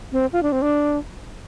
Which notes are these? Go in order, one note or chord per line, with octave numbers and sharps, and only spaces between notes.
C4
F4
D4
C4
D4